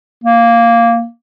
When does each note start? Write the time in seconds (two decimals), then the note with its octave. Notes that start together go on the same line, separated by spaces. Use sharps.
0.24 A#3